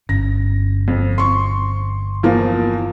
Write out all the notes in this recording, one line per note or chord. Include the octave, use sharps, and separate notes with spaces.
G1 C#4 A#6
F2
C6 C#6
E2 F3 A#3